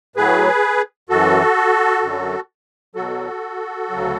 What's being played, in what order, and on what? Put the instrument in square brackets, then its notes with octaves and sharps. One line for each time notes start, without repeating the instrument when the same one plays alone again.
[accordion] A2 F#3 G#4 B4
F#2 E3 F#4 A4
F#2 D3 F#3
E2 B2 F#3 F#4 A4
D2 C#3 F#3